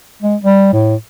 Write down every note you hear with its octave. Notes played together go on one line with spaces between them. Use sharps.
G#3
G3
A2